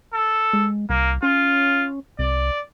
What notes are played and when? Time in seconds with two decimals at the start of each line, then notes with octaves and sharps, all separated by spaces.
0.13 A4
0.53 G#3
0.90 C2 A#3
1.23 C#4 F4
2.19 C2 D5